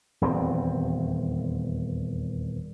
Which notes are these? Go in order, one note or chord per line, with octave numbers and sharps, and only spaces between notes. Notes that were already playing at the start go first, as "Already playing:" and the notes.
D#1 E2 C4